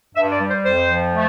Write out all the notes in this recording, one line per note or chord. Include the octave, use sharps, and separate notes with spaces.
G2 E5
D5
G3
C5
F2 C5
F3
A3